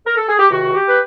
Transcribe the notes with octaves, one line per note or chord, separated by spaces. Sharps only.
A#4
A4
G#4
G4
C#2 C3 D#3 F#4
G4
B4